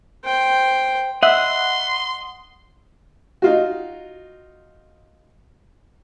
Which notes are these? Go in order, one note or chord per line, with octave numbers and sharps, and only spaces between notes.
C5 G5
D#5 E5 F#5 C6
D#4 F4 F#4